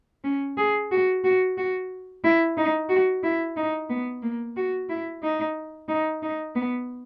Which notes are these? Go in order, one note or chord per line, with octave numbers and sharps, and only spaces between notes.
C#4
G#4
F#4
F#4
F#4
E4
D#4
F#4
E4
D#4
B3
A#3
F#4
E4
D#4
D#4
D#4
B3